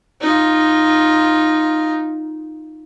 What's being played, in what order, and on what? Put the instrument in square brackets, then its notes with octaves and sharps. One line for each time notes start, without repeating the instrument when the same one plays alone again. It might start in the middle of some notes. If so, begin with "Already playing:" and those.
[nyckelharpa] D#4 F4